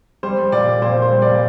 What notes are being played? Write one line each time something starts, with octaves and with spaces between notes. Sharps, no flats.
G3 C5
G3
A#2 D5
A#2
A#2 C5
A#2 C5
G3
D5
A#2